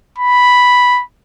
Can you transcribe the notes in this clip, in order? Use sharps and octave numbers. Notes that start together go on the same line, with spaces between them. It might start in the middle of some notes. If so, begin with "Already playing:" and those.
B5